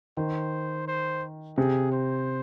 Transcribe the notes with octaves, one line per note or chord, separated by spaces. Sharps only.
D#3 C5
C5
C3 G#4
C5